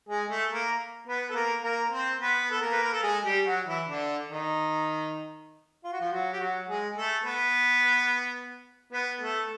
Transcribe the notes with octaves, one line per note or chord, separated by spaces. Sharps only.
G#3 G#4
A3 A4
A#3 A#4
B3 B4
A4
A#3 A#4
A#3 A#4
C4 C5
B3 B4
A4
A#3 A#4
B4
A#4
A4
G#3 G#4
G3 G4
F#3 F#4
E3 E4
D3 D4
D#3 D#4
F4
F#4
F3 F4
F#3 F#4
G4
F#3 F#4
G#3 G#4
A3 A4
B3 B4
B3 B4
A3 A4